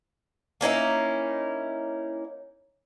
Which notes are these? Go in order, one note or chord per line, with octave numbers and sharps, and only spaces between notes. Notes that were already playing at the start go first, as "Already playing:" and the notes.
A#3 C#4 D#4 E4